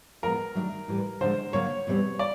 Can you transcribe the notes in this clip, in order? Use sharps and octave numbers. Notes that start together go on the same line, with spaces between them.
A2 F3 G#3 B3 A#4
G2 D#3 F#3 A3 D4
A2 E3 G3
D3 F3 G#3 C5
D3 F#3 A#3 D4 C#5
E2 B2 G3 C4
D5